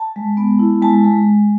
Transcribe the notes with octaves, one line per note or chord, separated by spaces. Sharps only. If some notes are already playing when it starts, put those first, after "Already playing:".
Already playing: A5
G#3
B3
E4
G#3 A5
G#3